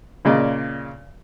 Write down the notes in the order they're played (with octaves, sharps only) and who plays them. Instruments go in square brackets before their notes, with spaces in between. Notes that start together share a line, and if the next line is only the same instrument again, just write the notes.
[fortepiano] A#2 C#3 D5 D#5